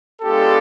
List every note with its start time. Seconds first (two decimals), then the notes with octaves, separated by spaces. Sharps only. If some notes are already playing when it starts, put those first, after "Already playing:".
0.22 G#3 B3 D4 F4 G4 A4